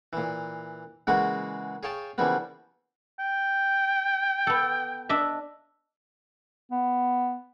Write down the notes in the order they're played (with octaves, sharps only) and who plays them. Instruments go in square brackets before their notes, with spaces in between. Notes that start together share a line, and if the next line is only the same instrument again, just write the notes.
[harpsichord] A#2 E3
C#3 E3 G#3 A#3 F#4 F#5
G#4 C#5 F5 G5 A5
C#3 E3 F3 G3 A#3 B3
[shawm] G5
[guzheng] B3 A4
D4 D#5 E5
[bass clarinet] B3